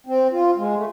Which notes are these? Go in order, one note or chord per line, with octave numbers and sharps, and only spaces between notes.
C4
F4
G#3
A3